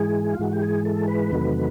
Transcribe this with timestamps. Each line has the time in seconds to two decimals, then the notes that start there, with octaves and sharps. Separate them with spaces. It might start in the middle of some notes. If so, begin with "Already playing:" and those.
Already playing: G#2 E3 G#3 G#4
0.33 F4
0.39 G#2 E3 G#3 F#4
0.53 G4
0.62 G#4
0.85 A4
1.07 B4
1.31 E2 C3 D#3 F#3 A3